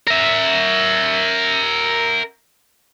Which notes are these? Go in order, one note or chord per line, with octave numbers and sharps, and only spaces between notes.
A#4 E5